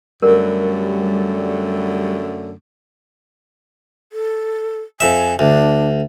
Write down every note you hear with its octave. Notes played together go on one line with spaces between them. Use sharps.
F#2 D3 G3 A3 A#4
A4
F2 E5 G#5
D2 D4